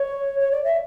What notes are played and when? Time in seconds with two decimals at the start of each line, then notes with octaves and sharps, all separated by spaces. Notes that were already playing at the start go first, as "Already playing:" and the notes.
Already playing: C#5
0.40 C#5
0.51 D5
0.64 E5